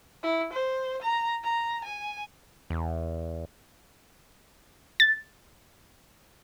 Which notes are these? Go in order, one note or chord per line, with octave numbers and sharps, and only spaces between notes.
E4
C5
A#5
A#5
G#5
E2
A6